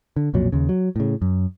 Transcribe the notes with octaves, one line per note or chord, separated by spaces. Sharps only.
D3
B1 F2 A#2 F#3
D#2 C#3
F#3
A2 C#3
F#2